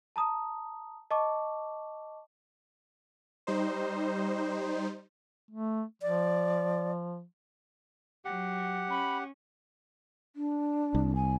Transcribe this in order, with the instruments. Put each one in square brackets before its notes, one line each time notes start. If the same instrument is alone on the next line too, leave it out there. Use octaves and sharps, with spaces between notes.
[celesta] A5 A#5 D#6
D#5 A5 C#6 D6
[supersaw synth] G3 D#4 C5
[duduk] A3
[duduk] F3 [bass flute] D5
[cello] F#3 [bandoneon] G4 F#5
[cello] C#4 [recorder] B5
[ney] D4
[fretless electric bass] C2
[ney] G#5